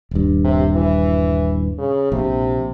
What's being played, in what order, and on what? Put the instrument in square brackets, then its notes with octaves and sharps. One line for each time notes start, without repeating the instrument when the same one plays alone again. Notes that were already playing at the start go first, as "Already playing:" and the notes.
[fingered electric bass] D#1 G2
[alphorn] C3
E3
C#3
[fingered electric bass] A#1 [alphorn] C3